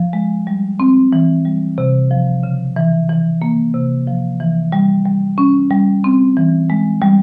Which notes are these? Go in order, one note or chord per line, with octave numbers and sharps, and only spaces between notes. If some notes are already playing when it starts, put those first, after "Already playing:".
Already playing: F3
G#3
G3
C4
E3
G3
C3
F3
C#3
E3
E3
A#3
C3
F3
E3
G3
G3
C#4
G3
C4
E3
G#3
G3